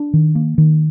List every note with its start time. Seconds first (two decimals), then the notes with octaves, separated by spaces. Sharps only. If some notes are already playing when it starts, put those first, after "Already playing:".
Already playing: D4
0.14 D#3
0.35 A#3
0.58 D#3